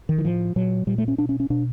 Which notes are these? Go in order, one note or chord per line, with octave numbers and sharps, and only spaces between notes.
D#3
E3
A2 F3
A#2 F#3
A#2 G3
A3
C#4
B2 D4
C#4
C#4
B2 D4